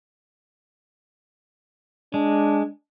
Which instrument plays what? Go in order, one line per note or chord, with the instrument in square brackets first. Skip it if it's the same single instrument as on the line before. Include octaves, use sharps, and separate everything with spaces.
[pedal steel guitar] G#3 [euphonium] D4